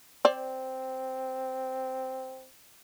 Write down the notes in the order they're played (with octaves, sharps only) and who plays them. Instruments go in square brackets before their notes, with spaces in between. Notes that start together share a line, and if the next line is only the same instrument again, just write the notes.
[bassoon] C4 [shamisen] C5 D5